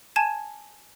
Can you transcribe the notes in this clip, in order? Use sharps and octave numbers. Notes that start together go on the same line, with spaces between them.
G#5 A5 G#6 D#7 E7